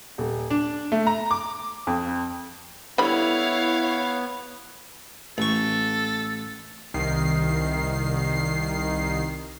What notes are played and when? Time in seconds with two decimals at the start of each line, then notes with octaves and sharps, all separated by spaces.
0.18 D#1
0.50 D4
0.92 A3
1.07 A#5
1.31 D6
1.87 F2
2.98 D3 G3 B3 E4 C#5 F5 B5
5.38 A1 A4 C#6
6.94 C2 D#3 C7